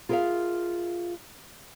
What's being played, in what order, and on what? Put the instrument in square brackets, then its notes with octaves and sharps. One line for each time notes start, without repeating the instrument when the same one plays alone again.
[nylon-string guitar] F4 G#4 A#4 B4 E5 F5